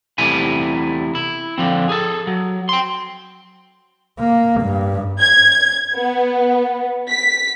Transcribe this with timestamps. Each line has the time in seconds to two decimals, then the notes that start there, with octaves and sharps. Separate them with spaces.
0.18 E2 C3 G3 A3 E4 G#5
1.15 E4
1.58 D3 F3 C4
1.89 G#4 A4
2.27 F#3
2.69 G5 C6
4.20 A#3
4.62 G2
5.21 G#6
5.96 B3
7.10 B6